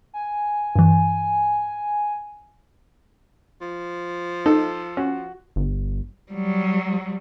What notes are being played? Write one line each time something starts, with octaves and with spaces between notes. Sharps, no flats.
G#5
G2 E3
F3
D#4 A4
C#4 F#4
G1
F#3 G3